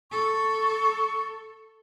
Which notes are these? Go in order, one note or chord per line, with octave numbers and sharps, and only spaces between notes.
A4 C#6